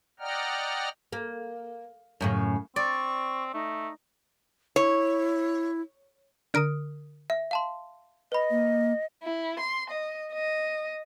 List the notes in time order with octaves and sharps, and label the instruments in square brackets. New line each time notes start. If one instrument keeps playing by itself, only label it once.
[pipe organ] D5 D#5 F#5 G5 A#5 F6
[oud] A#3
F#2 A2 C#3
[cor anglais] C4 [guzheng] D5 [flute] C#6
[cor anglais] A3 [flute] D#4
[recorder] E4 [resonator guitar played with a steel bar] C#5
[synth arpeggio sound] D3 A#4 D#6 [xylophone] F6 D7
[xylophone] E5
F5 A5 C6
[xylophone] B4 B5 [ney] D#5
[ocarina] A#3
[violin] E4
C6
D#5
D#5